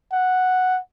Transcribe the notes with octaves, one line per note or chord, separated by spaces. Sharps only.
F#5